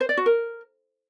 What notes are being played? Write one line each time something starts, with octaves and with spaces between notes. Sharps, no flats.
C5
D5
F#4
A#4